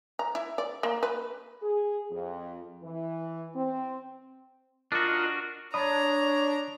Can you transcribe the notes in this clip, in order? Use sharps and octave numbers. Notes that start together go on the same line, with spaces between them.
A#5
E4
D5
A#3
B4
G#4
F2
E3
C4
D4 F4 F#4 A#4 D#5
D4 C#5 A#5 B5 D#6